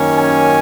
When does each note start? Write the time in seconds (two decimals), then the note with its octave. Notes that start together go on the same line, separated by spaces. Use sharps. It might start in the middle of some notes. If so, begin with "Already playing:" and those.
Already playing: F#2 D#3 A#3 C#4
0.17 G#5